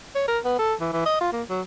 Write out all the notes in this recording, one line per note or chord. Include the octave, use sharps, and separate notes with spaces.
C#5
A#4
B3
A4
E3
E3
D#5
F4
A#3
F#3